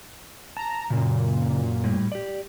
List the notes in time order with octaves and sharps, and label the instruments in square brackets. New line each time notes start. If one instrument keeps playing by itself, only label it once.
[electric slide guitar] A5 [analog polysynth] A#5
[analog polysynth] F#2 A#2 [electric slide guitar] C#3
[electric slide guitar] A2 G3
G4 D5